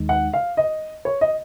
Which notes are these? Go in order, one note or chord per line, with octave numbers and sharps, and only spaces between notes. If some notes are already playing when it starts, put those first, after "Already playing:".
Already playing: D#2 D#3 G#3 D#4
F#5
F5
D#5
C#5
D#5